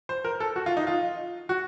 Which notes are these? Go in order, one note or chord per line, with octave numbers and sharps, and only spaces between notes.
C5
A#4
A4
F#4
F4
D#4
F4
F#4